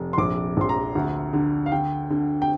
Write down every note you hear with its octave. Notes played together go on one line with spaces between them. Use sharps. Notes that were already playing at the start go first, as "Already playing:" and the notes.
Already playing: F1
C6
A#1 D6
A#1 C6
A#5
D2
D3
F5
D3 G5
D3
G5